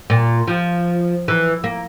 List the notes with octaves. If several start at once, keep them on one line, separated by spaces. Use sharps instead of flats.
A#2
F3
E3
A#3